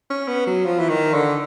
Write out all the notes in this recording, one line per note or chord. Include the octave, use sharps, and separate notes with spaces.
C#4
B3
F#3
F3
E3
D#3
D3